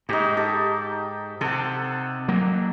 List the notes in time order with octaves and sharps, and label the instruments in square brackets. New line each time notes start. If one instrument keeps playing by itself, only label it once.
[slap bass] G#2 [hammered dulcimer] D#4 G4
[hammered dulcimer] G4 A4
[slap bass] C3 [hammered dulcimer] A4 F#5
[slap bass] F#3 A#3